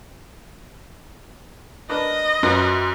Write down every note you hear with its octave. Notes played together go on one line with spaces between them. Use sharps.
D4 A#4 B4 D#5
F#2 C#4 F4 F#4 B4 A#5